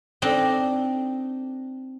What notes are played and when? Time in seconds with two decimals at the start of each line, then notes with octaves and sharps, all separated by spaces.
0.22 C4 D4 D#4